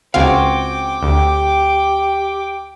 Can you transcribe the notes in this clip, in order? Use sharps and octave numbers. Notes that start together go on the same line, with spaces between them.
C#2 C4 F#4 F5 G5 G#5 D6
D2 G4